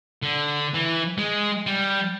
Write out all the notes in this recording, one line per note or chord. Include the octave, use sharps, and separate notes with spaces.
D3
E3
G#3
G3